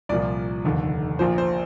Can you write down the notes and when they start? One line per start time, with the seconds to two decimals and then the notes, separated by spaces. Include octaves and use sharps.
0.09 C2 A#2 F3 D5
0.64 F1 D#2 D3
1.19 A#1 A#2 F3 C5
1.38 C5